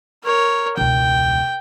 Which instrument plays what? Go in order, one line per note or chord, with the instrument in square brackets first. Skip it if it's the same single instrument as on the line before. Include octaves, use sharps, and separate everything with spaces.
[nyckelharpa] A#4 C#5
[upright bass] E1 C#2 [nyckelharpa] G5